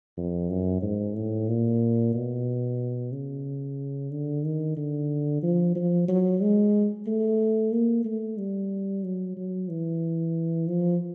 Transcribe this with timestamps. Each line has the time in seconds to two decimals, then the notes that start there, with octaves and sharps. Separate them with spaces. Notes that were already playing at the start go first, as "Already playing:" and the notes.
0.17 F2
0.50 F#2
0.82 G#2
1.16 A2
1.48 A#2
2.14 B2
3.12 C#3
4.11 D3
4.44 D#3
4.77 D3
5.43 F3
5.76 F3
6.08 F#3
6.41 G#3
7.07 A3
7.72 A#3
8.05 A3
8.38 G3
9.04 F#3
9.37 F#3
9.69 E3
10.68 F3